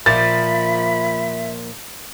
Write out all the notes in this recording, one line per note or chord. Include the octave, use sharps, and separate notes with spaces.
A#2 F3 E5 B5 A6